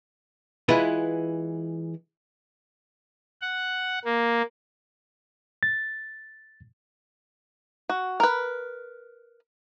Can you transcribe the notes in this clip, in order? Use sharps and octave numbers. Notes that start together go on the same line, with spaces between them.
E3 G#3 E4 F4 B4
F#5
A#3
A6
F#4
A#4 B4